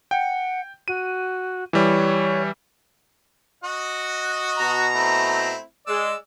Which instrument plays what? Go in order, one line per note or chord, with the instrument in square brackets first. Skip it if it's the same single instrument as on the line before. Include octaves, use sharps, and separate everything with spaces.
[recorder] F#5 [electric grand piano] G5
[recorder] F#4 [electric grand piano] D#7
[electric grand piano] E3 G3 [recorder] C#5
[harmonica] F#4 D#5 F#5
[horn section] B2 A#5
[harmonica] A3 C4 E4
[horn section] G#3 [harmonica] D5 E6